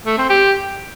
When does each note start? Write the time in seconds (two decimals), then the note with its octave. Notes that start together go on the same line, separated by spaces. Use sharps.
0.06 A3
0.18 C4
0.30 G4